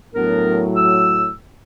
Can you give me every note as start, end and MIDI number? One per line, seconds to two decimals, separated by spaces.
0.14 1.30 45
0.14 1.30 54
0.14 0.65 59
0.14 0.65 62
0.14 0.65 70
0.76 1.31 88